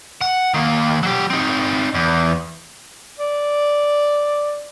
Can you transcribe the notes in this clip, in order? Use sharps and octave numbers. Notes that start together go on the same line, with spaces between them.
F#5
D#3 A#3
F#3 G4
C4 D#4
E2
D5